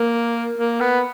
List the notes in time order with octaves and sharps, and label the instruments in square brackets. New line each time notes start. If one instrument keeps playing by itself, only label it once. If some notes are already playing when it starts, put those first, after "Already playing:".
Already playing: [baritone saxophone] A#3
A#3
B3